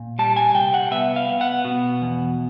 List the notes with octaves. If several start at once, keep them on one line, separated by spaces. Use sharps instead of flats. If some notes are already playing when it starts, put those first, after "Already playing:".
Already playing: A#2
G3 A5
G#5
C2 G5
F#5
B3 E5
F5
B3
F#5
B2
E2